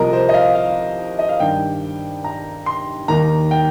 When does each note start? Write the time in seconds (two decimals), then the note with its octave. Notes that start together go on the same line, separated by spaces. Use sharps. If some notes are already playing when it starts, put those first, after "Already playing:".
Already playing: C2 C3 F3 A#4 D#5
0.13 C5
0.29 D#5
0.34 F5
0.55 F5
1.19 D#5
1.29 F5
1.40 G2 D#3 G5
2.24 A#5
2.66 C6
3.08 D#2 D#3 A#5
3.51 G5